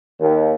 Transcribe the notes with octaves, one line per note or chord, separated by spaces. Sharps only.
D#2